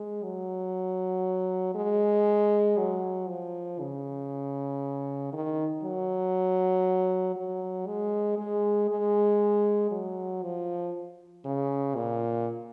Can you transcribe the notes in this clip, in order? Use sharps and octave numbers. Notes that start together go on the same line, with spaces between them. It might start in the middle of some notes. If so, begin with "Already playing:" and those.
Already playing: G#3
F#3
G#3
F#3
F3
C#3
D#3
F#3
F#3
G#3
G#3
G#3
F#3
F3
C#3
A#2